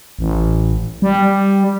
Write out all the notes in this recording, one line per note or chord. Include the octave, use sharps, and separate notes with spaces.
A1
G3